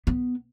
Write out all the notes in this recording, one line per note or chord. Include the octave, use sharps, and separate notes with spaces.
B3